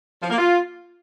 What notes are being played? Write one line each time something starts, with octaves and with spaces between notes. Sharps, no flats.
F3
A#3
F4